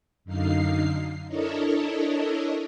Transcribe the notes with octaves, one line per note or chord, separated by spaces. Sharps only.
F#2 D3 D#4 F5 C7
D4 E4 A4 A#4 C#5 D#5